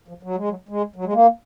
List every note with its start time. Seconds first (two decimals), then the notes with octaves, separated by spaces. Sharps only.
0.08 F3
0.23 F#3
0.36 G#3
0.49 F#3
0.69 G#3
0.96 F#3
1.05 G#3
1.13 A#3